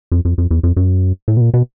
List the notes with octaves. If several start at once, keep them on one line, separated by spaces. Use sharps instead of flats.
F2
F2
F2
E2
F2
F#2
A2
B2
A#2
B2